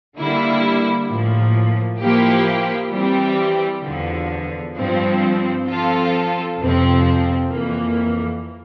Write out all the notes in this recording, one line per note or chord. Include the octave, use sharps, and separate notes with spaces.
D3 G3 A#3 E4
A2 F3 A#3
F3 A#3 E4 G4
E3 G3 C4 G4
E2 D3 F3
G2 F3 C4
F3 C4 F4 A4
F2 C3 F3 C4
F2 E3 A#3